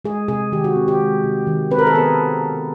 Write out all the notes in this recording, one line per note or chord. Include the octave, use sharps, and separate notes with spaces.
G#3 G#4
C3 G#4
D#3 G4
F#4
C4
G4
G#3
C3
D#3
C4 B4
A#4
A4
B3 G#4